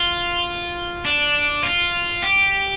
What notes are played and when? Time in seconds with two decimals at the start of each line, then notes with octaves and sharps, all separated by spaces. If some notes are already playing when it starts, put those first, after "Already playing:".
Already playing: F4
1.05 D4
1.63 F4
2.22 G4